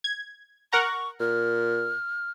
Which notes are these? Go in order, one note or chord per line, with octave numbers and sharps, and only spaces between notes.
G#6
A#4 F#5 A#5 C#6
A#2 F6